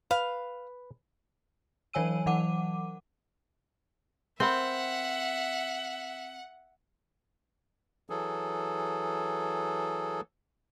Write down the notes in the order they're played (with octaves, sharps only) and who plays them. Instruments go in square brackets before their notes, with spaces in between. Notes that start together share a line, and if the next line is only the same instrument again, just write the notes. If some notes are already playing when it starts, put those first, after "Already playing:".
[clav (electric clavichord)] B4 [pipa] F5
[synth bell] E3 F#3 C#5 G#5 E6 D#7
E3 F#3 F#5 D6 D#7
[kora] C4 [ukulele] A#4 C5 B5 [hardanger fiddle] E5 [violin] F#5
[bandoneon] E3 F#3 G#4 A4